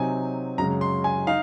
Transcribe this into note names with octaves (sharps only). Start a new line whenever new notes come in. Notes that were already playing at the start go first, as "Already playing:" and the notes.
Already playing: C3 F#3 C4 D#4 G#5
F#2 C#3 G#3 C#4 A#5
C6
G#5
D#4 F5